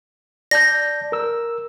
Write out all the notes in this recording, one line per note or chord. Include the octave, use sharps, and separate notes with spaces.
D5 A5 G6 A#6
A#4 E6